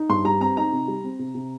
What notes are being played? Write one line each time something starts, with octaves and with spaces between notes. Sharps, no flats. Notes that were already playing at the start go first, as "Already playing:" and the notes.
Already playing: D#4
G2 C6
G3 A#5
C4 A#5
D#4 A#5
C3
G3
C4
C3
C3